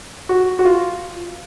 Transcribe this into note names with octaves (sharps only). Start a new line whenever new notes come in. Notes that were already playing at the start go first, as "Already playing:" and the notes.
F#4
F#4
F4